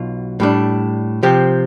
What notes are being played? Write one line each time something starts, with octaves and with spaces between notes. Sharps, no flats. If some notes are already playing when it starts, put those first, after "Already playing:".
Already playing: B1 B2 F4
A2 G3 D4
C3 F3 C4 G4